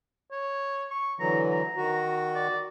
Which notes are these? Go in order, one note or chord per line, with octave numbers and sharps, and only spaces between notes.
C#5
C#6
D3 E3 F#3 A#5
A#5
D#3 F#4
D5